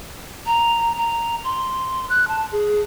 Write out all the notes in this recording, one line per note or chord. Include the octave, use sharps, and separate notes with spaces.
A#5
A#5
C6
F#6
A5
G#4